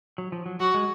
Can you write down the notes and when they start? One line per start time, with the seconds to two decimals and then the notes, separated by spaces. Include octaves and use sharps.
0.18 F#3
0.32 F3
0.46 F#3
0.60 F#3 F#4
0.74 G#3